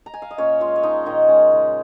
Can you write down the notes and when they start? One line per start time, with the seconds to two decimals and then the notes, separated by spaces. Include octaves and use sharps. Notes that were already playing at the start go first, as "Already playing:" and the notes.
0.06 A#5
0.14 G#5
0.22 F5
0.31 D#5
0.38 A#2 C#4 C#5
0.60 G#3 F4 F5
0.76 C#5
0.83 F3 D#4 D#5
1.06 A#2 D#3 D#4
1.28 G#3 C#4
1.52 C#3